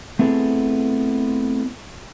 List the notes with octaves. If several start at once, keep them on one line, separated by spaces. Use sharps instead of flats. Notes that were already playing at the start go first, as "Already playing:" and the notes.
A3 B3 C4 E4 G#4 A4